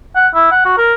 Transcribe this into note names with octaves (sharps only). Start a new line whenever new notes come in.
F#5
E4
F#5
F#4
A#4